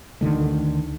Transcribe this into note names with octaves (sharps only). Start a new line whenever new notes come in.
D2 D3 D#3 A3